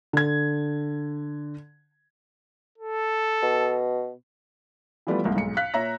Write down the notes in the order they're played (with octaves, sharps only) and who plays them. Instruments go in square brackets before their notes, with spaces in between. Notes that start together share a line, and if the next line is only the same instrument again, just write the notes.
[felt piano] D3 G#6
[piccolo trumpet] A4
[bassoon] B2
[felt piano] E3 F3 G3 A3 B3 B4
C2 G#2 A#3
B1 G#2 C#7
F5 F#6 B6
A#2 C#5 E5 A#5 A#6